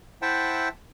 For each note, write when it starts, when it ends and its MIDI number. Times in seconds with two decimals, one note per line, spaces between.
0.22 0.69 64
0.22 0.69 72
0.22 0.69 76
0.22 0.69 78
0.22 0.69 79
0.22 0.69 81